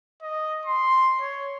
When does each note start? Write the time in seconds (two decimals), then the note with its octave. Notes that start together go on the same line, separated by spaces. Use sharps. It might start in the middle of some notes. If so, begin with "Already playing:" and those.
0.22 D#5
0.66 C6
1.21 C#5